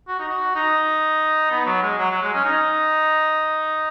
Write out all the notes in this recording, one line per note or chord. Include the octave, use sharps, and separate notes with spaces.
F#4
D#4
F#4
D#4
B3
F#3
G#3
F#3
F#3
G#3
C#4
D#4